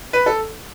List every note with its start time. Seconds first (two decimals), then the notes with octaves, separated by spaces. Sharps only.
0.13 B4
0.26 A4